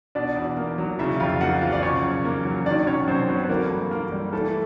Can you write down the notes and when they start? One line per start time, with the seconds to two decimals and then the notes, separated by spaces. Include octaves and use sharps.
0.15 B2 D4 D5
0.36 E2
0.57 A#3
0.78 F#3
0.99 C#3 E4 E5
1.20 F2 F4 F5
1.40 A#3 F#4 F#5
1.61 F3 F4 F5
1.72 D5
1.82 C#3 C#4 C#5
2.03 F#2
2.25 A#3
2.45 F#3
2.66 D#3 D4 D5
2.87 F#2 C#4 C#5
3.08 F#2 C4 C5
3.29 F#3 B3 B4
3.43 B4
3.49 D3 A#3 A#4
3.71 G2
3.91 G2 A#3 A#4
4.12 G3
4.33 E3 A3 A4